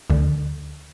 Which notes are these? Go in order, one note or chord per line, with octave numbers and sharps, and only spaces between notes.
D2 D3